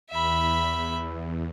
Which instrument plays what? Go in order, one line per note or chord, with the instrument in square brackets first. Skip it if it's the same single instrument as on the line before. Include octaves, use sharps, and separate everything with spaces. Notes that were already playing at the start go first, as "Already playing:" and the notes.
[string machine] E2 [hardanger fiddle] E5 B5